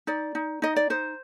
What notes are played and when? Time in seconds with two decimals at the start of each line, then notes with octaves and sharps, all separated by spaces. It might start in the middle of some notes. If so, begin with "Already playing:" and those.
0.07 D#4 D5
0.35 D#4
0.62 D#4 D#5
0.76 D5
0.90 D#4 C5